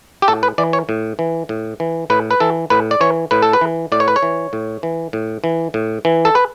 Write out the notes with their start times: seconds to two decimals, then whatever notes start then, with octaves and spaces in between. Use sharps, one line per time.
0.22 G4
0.28 A2 A4
0.43 B4
0.58 E3 D5
0.73 C#5
0.89 A2
1.19 E3
1.49 A2
1.80 E3
2.10 A2 B4
2.31 B4
2.40 E3 A4
2.70 A2 B4
2.91 D5
3.01 E3 C#5
3.31 A2 B4
3.42 A4
3.53 B4
3.61 E3
3.92 A2 D5
4.00 C#5
4.08 B4
4.16 C#5
4.23 E3
4.53 A2
4.83 E3
5.13 A2
5.44 E3
5.74 A2
6.05 E3
6.25 A4
6.35 B4